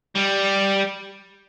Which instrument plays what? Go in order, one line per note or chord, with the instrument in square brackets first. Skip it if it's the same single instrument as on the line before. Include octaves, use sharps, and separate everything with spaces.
[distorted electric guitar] G3